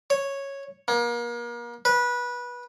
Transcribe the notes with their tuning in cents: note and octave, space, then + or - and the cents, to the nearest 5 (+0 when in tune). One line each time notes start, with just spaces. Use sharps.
C#5 -5
A#3 +35
B4 -20